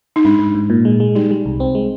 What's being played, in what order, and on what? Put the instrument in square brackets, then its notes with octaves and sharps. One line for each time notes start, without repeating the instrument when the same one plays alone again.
[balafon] D#4
[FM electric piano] G#2 [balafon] D4
[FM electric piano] G#2
G#2
A#2
G#3
G#3
[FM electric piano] G3 [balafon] D#4
[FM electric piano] G3
C2
C4
G#3